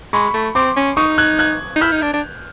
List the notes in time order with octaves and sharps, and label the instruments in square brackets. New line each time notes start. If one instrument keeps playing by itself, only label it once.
[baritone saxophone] G#3 [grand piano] B5 C#6
[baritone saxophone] A3
[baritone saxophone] C4 [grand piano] C6 D6
[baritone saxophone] C#4
[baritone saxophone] D#4 [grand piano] C#6 D#6
[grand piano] F#6 G#6
F#6 G#6
[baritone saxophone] D#4
[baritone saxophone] E4 [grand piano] F6 G6
[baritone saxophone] D#4
D4
D4